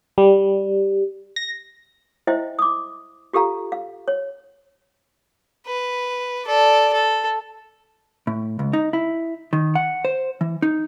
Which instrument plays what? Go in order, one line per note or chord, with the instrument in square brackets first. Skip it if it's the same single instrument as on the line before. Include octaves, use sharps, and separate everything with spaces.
[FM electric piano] G3
A#6
[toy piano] E4 C5 D#5 E5 G5
D6 D#6
F4 G4 A4 F5 A#5
F5
C#5
[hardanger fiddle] B4
A4 D5
A4
[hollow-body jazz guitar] A2
C#2
D#4
E4
D#3
F#5
C5
E3
D#4